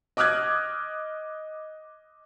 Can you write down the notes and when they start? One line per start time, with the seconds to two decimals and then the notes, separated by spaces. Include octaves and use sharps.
0.17 D#5 D6 D#6 F6 F#6 G#6